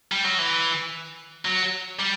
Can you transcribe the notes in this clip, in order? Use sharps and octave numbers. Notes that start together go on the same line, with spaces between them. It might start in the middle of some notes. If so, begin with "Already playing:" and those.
G3
F#3
E3
F#3
G3